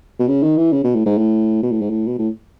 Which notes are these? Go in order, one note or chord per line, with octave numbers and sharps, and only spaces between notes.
B2
C#3
D#3
E3
C#3
B2
A2
G#2
A2
B2
A2
G#2
A2
B2
A2